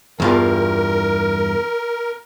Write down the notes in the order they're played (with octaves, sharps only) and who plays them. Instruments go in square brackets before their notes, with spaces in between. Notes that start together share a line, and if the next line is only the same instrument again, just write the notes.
[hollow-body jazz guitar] E2 G2 F4 [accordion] A#4